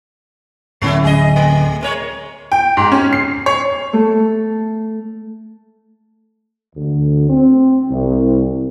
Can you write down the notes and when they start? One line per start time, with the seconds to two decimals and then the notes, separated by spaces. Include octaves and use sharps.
0.82 D1 A2 G#3 C#4 E4
1.04 G#4 D#5
1.36 A3
1.81 G#3 A#4 C#5
2.52 G5
2.77 G#2
2.92 C#4
3.13 C7
3.46 C#5
3.93 A3 A4
6.75 D2
7.29 C4
7.89 C2